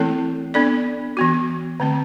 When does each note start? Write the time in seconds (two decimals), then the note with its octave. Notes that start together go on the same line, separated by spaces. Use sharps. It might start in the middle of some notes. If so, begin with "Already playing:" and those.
Already playing: E3 A3 C4 E4 A4
0.54 B3 D4 A4 D5
1.17 E3 B3 F#4
1.80 D3 A3 C4